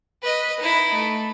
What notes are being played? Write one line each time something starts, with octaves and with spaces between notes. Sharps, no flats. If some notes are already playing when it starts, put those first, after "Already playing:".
B4 D#5
D#4 E4
A3